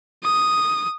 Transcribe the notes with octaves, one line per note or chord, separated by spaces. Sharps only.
D#6